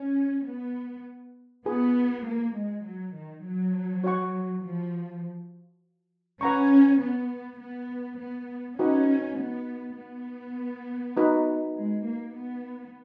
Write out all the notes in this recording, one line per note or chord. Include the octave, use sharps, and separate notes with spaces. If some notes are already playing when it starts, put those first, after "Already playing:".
Already playing: C#4
B3
B3 F4 G#4 B4
A#3
G#3
F#3
D#3
F#3
F#4 C#5 F#5 C#6
F3
C#4 B4 F#5 A#5 C#6
B3
B3
B3
C#4 D#4 F#4 B4 F#5
B3
B3
D#4 F#4 B4
G#3
A#3
B3